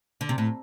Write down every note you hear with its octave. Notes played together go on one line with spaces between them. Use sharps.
D3
C3
A2